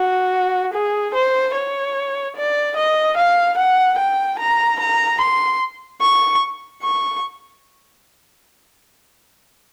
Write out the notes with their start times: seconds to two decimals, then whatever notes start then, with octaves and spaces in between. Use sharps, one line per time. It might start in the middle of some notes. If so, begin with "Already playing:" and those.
Already playing: F#4
0.73 G#4
1.14 C5
1.54 C#5
2.36 D5
2.76 D#5
3.17 F5
3.57 F#5
3.98 G5
4.39 A#5
4.79 A#5
5.20 C6
6.01 C#6
6.82 C#6